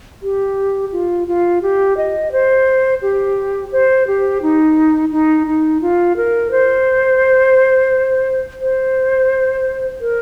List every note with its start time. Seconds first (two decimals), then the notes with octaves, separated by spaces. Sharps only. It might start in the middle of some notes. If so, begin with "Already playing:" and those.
0.22 G4
0.92 F4
1.28 F4
1.62 G4
1.97 D#5
2.32 C5
3.02 G4
3.72 C5
4.07 G4
4.42 D#4
5.12 D#4
5.47 D#4
5.81 F4
6.17 A#4
6.51 C5
8.61 C5
10.01 A#4